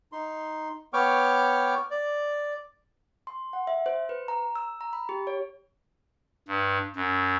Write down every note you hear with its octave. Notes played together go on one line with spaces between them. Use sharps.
D#4 C6
B3 C#5 G5 C#6 D6 F6
D5
C6
F#5
E5
C5
B4
A#5
E6
A#5
B5
G4
C#5
G2
F#2